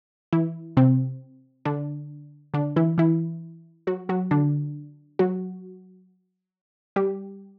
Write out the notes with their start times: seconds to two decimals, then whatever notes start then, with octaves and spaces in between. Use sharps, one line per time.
0.33 E3 E4
0.77 C3 C4
1.65 D3 D4
2.54 D3 D4
2.76 E3 E4
2.98 E3 E4
3.87 F#3 F#4
4.09 F#3 F#4
4.31 D3 D4
5.19 F#3 F#4
6.96 G3 G4